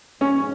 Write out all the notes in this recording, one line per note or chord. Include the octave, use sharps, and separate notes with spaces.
G#2 F3 C#4